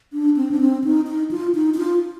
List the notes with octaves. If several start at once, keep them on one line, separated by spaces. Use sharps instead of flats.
D4
C4
D4
C4
D#4
D#4
F4
D#4
D#4
F4